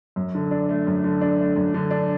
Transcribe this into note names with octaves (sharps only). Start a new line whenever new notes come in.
F#2
D3
D4
A3
F#2
D3
D4
A3
F#2
D3
D4